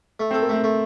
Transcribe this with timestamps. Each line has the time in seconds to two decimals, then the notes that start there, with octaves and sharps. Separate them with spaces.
0.20 A3
0.31 C4 A4
0.42 A#3
0.49 A3 C4
0.64 A3